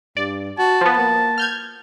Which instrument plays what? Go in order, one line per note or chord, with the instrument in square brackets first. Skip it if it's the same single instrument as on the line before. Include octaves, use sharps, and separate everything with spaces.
[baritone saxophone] G2 [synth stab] D5
[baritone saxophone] F#4 [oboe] A5
[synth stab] F3 B3
[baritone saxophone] A#3
[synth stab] F6 G6 G#6